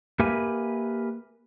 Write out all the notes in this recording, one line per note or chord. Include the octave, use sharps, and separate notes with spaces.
A#3 G4 A#4 B4 E5 G#5